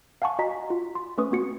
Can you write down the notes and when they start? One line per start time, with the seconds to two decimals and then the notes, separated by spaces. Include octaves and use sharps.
0.22 F5 F#5 G#5 A5 C#6
0.39 F#4 D#5 G#5 A#5 B6
0.70 F4
0.95 C6
1.18 A3 C#4 B4 C#6 D#6
1.31 A#3 C4 F#4 C#7